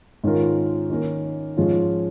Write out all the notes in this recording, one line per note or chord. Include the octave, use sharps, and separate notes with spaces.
G#2 D#3 C#4 F4 A#4
D#3 A#3 C#4 A#4
G#2 F3 G#3 C#4 F4